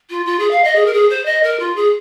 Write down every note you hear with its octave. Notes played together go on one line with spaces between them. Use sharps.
F4
F4
G#4
F5
D#5
G#4
A#4
G#4
C5
D#5
A#4
F4
G#4